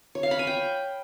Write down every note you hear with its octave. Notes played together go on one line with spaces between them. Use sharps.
C#5
F5
B5
G#5
G5